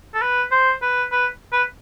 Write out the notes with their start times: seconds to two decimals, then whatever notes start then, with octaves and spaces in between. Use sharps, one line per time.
0.14 A4
0.22 B4
0.51 C5
0.82 B4
1.12 B4
1.52 B4